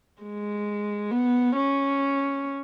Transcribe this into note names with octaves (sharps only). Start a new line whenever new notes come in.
G#3
B3
C#4